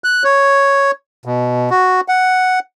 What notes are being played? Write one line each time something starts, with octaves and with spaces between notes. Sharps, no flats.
F#6
C#5
B2
F#4
F#5